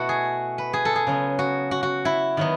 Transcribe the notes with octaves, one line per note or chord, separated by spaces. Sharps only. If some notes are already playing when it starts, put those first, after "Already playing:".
Already playing: B2 A3 E4 F#4
G#4
B4
G#4
A4
G#4
C#3 F#3 B3
F#4
F#4
F#4
E4
D#3 F#3 B3